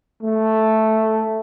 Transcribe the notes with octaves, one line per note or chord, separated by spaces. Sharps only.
A3